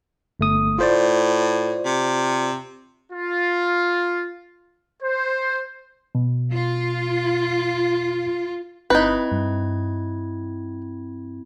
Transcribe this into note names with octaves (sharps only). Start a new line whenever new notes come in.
G1 A3 D#6
A2 F4 C5 D5
C3
F4
C5
B2
F4
G1 C4 D#4 E4 B4 G#6
G2